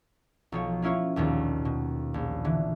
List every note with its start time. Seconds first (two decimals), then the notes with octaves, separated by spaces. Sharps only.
0.52 B1 F3 C#5
0.82 A#3 C#4 E4 F4 C#5
1.16 A#1 D#2 B2 D#3
1.65 B2
2.14 A#1
2.44 D3 E3